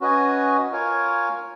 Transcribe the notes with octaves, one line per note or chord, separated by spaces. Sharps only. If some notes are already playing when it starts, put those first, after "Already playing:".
C#4 F#4 B4 D#5 G#5
F4 A#4 C#5 G#5